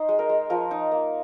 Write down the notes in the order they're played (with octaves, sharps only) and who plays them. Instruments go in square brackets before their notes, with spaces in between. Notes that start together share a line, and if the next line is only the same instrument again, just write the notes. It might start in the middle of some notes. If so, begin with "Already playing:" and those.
Already playing: [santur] D#4 C5 D#5
G#3
A#4
G#3
F3 A#4
D#4
A#3